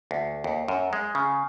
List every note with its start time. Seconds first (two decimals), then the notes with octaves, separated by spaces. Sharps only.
0.11 D2
0.44 D#2
0.68 F#2
0.93 G#3
1.15 C#3